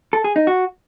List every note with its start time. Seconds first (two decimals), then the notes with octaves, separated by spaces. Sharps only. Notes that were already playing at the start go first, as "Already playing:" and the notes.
0.13 A4
0.24 G#4
0.36 D#4
0.47 F#4